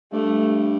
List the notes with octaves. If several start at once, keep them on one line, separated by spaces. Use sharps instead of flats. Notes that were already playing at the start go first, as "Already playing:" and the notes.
G2 A3